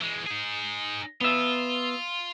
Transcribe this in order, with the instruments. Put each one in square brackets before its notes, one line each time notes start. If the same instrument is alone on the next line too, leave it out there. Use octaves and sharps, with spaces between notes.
[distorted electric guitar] E3 G#3
D#4 G#4
[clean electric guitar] B3 E5 [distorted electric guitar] F4